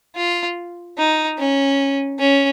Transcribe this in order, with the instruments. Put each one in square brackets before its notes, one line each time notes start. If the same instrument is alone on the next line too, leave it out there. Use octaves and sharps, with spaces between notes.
[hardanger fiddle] F4
D#4
C#4
C#4